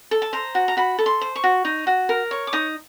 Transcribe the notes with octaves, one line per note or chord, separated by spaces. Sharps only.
A4
A5
C5 A#5
F#4
A#5
F#4 B5
A4
C6
C5
C#6
F#4
D#4
F#4
A#4
C#5
D6
D#4 D#6